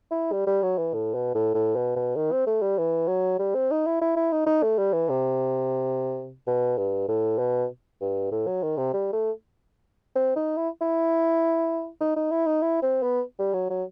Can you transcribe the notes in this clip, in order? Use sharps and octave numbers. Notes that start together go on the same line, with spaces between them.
E4
G3
G3
F#3
E3
A2
B2
A2
A2
B2
B2
D#3
C4
A3
G3
E3
F#3
G3
C4
D#4
E4
E4
E4
D#4
D#4
A3
G3
E3
C3
B2
G2
A2
B2
G2
A2
F#3
D#3
C3
G3
A3
C4
D#4
E4
E4
D#4
D#4
E4
D#4
E4
C4
B3
G3
F#3
F#3